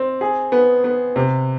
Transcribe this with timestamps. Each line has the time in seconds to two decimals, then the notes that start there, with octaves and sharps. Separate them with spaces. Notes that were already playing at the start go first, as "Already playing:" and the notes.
Already playing: C4
0.21 G#4
0.52 B3
0.84 B3
1.16 C3